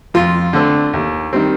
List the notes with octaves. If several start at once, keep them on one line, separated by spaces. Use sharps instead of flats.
F2 F4
D3 A3 C4
D#2
D#3 G3 C4